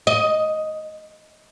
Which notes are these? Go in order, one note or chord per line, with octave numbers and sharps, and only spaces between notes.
D#5